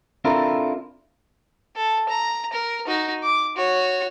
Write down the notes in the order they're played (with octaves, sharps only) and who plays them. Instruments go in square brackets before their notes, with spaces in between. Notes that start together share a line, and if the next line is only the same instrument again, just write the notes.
[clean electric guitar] C4 D4 E4 F4 A4 A#4
[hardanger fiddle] A4
A#5
A#4
D#4 F#4
D6
F#4 C#5